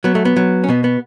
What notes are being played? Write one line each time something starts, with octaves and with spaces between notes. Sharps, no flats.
F#3 B3
A3
B3
F#3
C#4
B2 B3
B3